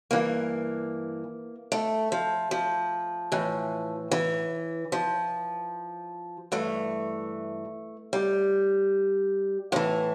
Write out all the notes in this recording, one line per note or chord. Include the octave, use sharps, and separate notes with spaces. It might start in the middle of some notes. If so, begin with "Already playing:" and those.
G2 E3 A#3
A3
F3
F3
A2 E3
E3
F3
G2 E3 A3
G3
A2 E3 F3